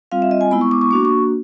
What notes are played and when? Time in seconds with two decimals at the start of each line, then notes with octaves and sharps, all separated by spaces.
0.12 G3 C4 F4 F5
0.22 E5
0.31 D#5
0.41 G#5
0.51 G#3 B3 E4 B5
0.61 C#6
0.71 D6
0.81 C#6
0.91 A#3 D4 F#4 D6
1.05 C#6